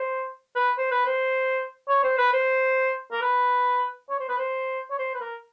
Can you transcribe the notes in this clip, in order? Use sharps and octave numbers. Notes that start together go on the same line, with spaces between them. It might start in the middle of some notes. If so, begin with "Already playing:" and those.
Already playing: C5
B4
C5
B4
C5
C#5
C5
B4
C5
A#4
B4
C#5
C5
B4
C5
C#5
C5
B4
A#4